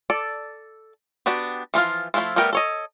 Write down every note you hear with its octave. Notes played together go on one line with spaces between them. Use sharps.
A4 D5
B3 D4 F#4 G4
E3 F3 F4 F5
F3 G#3 A3 E4 F4
G3 A3 B3 A#4 G5
A4 C#5 D#5